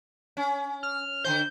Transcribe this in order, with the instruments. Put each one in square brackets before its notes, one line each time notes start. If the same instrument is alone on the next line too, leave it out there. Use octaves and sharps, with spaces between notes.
[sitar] C#4
[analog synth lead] F6
[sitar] D3 D#3 C5 [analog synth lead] G6